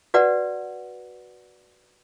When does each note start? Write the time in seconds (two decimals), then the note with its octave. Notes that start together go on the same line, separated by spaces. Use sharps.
0.14 F#4 B4 D5 F#5